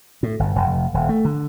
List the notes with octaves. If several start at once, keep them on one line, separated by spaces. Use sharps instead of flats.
A2
G1
F1
D#1
A3
D3